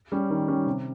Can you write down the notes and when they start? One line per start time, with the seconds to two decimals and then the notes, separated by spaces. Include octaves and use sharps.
0.12 G3 C#4
0.30 D#3
0.48 G3 C#4
0.66 C3